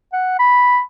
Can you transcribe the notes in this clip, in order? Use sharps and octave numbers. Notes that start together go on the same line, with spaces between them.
F#5
B5